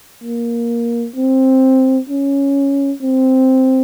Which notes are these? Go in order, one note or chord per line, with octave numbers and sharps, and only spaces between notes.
A#3
C4
C#4
C4